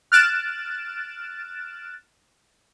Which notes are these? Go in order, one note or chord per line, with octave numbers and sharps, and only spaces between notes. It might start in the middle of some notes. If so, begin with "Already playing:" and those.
F6 F#6 A6 D7 E7